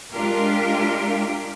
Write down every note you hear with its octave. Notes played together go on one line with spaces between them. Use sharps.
G#3 D4 F4 G4 A#4